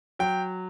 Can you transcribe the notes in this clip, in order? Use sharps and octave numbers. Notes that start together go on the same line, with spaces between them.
F#3 G5